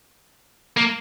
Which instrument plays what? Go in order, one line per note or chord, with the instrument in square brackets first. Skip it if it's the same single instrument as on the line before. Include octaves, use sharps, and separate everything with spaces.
[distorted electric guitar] A#3